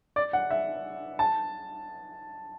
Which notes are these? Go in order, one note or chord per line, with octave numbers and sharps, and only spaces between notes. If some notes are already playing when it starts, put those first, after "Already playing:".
D5
F#5
E5
A5